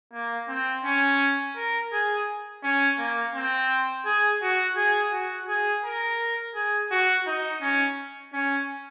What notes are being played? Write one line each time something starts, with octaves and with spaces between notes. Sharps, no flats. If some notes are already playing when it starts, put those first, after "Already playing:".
A#3
C4
C#4
A#4
G#4
C#4
A#3
C4
G#4
F#4
G#4
F#4
G#4
A#4
G#4
F#4
D#4
C#4
C#4